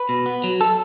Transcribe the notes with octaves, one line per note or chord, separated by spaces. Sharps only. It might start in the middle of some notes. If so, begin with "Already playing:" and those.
Already playing: B4
B2
B3
F#3
A4